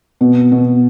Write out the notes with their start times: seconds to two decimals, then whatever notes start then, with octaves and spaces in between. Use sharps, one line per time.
0.21 B2
0.52 B2